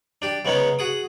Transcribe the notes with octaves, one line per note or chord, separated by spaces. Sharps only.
D4 G4
C#3 G#3 B3 C#4 D#4 C#5
F#4 G#4 D#6